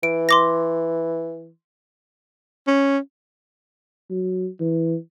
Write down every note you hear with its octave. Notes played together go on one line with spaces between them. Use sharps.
E3 D7
C6 D6 A#6
C#4
F#3
E3